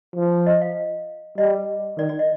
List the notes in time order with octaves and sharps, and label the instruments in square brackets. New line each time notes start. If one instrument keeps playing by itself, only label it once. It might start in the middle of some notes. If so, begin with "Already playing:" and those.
[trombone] F3
[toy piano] D#5
F5
[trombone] G3 [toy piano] D#5
[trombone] D#3 [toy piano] D5
[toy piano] D5
D#5